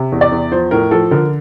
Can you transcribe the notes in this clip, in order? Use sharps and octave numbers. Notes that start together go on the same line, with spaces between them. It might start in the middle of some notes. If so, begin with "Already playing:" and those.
Already playing: C3
E2
D5
E2
F3 C5
A2 A#4
F3 A4
D3 A#4